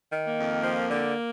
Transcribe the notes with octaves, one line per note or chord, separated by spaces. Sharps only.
D#3
A#3
F2
F3
D3